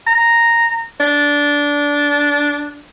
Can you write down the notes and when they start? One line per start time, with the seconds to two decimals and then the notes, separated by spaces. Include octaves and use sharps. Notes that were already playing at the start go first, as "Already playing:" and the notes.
0.07 A#5
1.00 D4